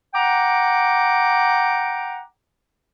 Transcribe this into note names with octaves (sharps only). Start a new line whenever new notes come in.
F#5 G5 A#5 D6